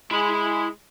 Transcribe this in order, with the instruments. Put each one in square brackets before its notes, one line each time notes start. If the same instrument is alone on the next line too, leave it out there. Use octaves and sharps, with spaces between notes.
[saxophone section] G#3 [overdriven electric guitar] E4 B5